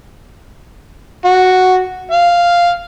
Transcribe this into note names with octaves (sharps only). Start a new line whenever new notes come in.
F#4
F5